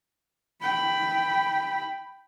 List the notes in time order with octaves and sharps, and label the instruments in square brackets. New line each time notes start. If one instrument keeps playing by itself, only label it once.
[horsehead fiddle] G5 B5